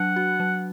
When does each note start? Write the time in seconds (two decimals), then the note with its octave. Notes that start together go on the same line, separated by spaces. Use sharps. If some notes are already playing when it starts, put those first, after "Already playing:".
Already playing: F#3 D4 F#5
0.16 F#4
0.40 F#3